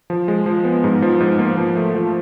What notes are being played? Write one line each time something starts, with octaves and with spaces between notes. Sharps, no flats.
F3
G#3
F3
B3
G#2
F3
G#2
A#3
F3
A3
F3